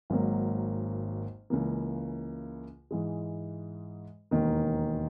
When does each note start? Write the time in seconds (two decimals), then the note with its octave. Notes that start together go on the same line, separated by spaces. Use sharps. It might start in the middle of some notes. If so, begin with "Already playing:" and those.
0.10 G#1 G#2 F#3 A#3
1.50 C#2 C#3 E3 A#3
2.91 G#2 E3 G#3
4.31 E1 D#2 D#3 A#3